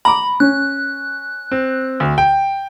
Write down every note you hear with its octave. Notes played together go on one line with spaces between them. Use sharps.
A#5 B5 D6
C#4 F#6
C4
D2
G5